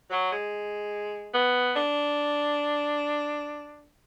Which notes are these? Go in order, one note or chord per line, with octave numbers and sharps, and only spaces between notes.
F#3
G#3
B3
D4